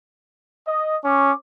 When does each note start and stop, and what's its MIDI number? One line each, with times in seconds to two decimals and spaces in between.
0.67 0.97 75
1.05 1.32 61
1.05 1.34 73
1.05 1.34 85
1.05 1.34 86